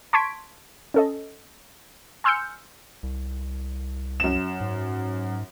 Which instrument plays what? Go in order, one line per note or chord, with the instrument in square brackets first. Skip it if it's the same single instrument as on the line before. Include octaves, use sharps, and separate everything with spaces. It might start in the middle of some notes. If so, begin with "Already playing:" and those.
[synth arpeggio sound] A5 C6 C#6 G#6 B6 D7
C#4 A4 D#5
G#5 C6 E6 F6 G6 C#7
[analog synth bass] C2
[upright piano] F#2 E7
[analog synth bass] G#2